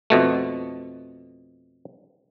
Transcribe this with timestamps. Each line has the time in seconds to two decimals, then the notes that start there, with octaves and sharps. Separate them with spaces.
0.10 F2 B2 A3